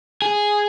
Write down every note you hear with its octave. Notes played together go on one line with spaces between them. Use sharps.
G#4